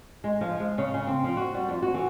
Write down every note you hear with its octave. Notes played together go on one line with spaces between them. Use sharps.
G#3
F3
G#3
C#3
C#3
C4
F3
F#4
G3
F2
F#4
E3